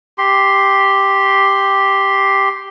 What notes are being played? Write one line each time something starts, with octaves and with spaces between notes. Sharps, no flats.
G4 C6